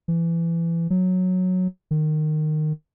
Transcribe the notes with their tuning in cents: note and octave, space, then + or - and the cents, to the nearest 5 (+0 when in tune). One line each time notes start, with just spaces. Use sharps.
E3 +25
F#3 -10
D#3 -20